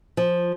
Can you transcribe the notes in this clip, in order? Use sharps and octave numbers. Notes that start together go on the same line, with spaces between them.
F3